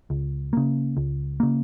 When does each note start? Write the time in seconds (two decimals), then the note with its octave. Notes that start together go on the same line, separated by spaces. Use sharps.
0.10 C#2
0.53 C#3 A#3
0.97 C#2
1.40 C#3 A#3